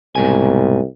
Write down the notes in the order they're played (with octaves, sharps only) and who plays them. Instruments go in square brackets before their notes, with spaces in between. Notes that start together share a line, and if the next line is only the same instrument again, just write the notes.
[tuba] C2 [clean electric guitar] G#2 B2 G#5